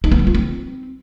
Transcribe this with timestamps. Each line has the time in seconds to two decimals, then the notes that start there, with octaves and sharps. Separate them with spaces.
0.04 D#4
0.12 B3
0.19 G3
0.27 F4
0.35 C4